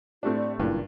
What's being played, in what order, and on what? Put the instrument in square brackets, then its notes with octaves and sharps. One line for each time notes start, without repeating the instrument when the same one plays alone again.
[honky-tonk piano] A2 A3 G4 [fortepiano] C4 D4 [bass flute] F4
[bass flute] D5
[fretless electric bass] F#1 A#2 [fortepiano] G2 [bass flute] E4